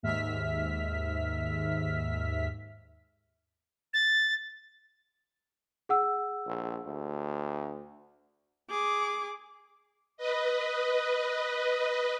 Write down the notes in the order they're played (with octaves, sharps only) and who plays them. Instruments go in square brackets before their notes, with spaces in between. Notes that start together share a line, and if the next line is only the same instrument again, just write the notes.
[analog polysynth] D#2 G#2 E5 F6 B6
[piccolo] A6
[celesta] G#4 F#5 E6
[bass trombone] A#1
D2
[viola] G#4 D6
[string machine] B4 D#5